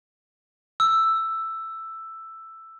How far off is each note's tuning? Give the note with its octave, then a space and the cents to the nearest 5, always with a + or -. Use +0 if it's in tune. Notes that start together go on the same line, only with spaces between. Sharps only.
E6 +5